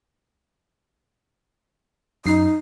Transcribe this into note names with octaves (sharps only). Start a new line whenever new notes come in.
F#2 D#4 C7